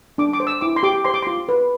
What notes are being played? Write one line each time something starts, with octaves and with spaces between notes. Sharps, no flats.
D4 D6
D6
C5
E6
E4 D6
C6
G4 D6
C5 C6
D6
F4 C6
B4